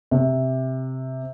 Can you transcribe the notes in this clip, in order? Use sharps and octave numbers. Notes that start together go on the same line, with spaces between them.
C3